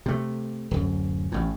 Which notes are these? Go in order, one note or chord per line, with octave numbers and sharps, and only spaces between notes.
C3 A3
D1 F#2
A1 A2